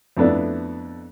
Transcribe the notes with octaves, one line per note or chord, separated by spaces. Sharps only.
F2 A3 B3 D4 E4